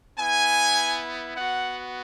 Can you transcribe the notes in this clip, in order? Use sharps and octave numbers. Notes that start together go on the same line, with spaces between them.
B3 E4 G#5
B3 F#4 F#5